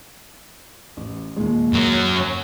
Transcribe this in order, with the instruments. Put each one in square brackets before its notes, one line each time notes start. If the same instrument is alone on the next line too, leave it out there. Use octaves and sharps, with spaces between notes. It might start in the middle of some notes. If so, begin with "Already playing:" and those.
[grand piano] A1
D#2 A#2 G#3
[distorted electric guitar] F#2 F#3
[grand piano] C#5 F#6